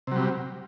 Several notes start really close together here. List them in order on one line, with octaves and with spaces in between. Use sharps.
C3 F#3 G3